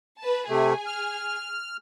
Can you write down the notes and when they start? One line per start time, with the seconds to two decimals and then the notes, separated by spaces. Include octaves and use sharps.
0.20 B4 A5
0.49 C3 A3 G#4 G#5
0.87 F6